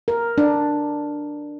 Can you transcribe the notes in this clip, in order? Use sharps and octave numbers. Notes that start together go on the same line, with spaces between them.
A#4
D4